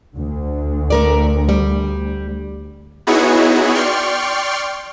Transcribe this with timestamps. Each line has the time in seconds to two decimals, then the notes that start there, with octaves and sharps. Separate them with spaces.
0.15 D2
0.90 A3 A#4 D5
1.49 G3
3.07 B3 D#4 E4 F#4 G#4 C#5
3.74 D5 G5 C6 C#6 F6